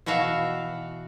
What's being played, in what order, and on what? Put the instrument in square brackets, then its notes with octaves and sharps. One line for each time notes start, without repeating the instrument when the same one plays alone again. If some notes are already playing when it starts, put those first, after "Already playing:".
[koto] B2 E3 F#4 E5 F5